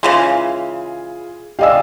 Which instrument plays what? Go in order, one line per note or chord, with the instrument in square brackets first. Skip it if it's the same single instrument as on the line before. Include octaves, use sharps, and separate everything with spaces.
[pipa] C#3 E3 G#3 [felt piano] F4 G#4
[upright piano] G4 D5 D#5 [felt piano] F5 G#5 E6